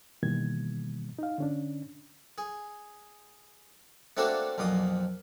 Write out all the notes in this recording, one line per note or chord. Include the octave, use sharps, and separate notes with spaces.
B2 D#3 E3 G3 A#3 G#6
D#4 F5
D3 C#4 D4
G#4
A3 A#3 C4 D4 F#4 A4
B1 F2 A#2 D#6